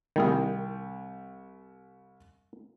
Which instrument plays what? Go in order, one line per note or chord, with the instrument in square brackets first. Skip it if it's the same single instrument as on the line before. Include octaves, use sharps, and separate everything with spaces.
[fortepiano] C2 G3 G5 [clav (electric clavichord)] D#3 E4 G#4